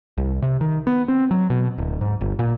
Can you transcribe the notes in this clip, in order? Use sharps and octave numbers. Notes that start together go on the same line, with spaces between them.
C2
C3
D#3
B3
C4
F#3
B2
D1
G#2
G1
A#2